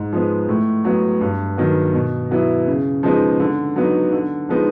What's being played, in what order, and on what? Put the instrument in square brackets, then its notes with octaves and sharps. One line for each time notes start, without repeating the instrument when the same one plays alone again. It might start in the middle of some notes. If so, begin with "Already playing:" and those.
Already playing: [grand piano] G#2
F3 G#3 B3
A2
F#3 B3
G2
D#3 F#3 B3
B2
F#3 B3 E4
C#3
F3 G#3 B3 D#4
D3
F#3 B3 D#4
D3
F3 G#3 B3 D#4